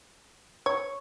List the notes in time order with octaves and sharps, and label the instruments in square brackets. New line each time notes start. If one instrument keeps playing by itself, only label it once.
[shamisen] C#5 [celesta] C#6